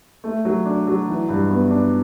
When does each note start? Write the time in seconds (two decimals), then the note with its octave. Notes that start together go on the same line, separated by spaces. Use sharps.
0.24 A3
0.45 F#3
0.65 D4
0.87 F#3
1.07 E3
1.29 G2
1.50 B3
1.71 D4